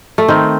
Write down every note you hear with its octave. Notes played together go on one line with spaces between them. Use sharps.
A3
D#3 C4